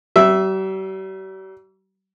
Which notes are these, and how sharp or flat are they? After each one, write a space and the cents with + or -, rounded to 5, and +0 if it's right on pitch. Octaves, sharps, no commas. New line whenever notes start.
G3 -45 E5 +0